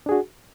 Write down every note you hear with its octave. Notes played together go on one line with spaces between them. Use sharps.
D4 F#4 G#4